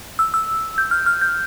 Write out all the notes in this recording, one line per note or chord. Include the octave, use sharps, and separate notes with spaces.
E6
E6
G6
F6
F6
G6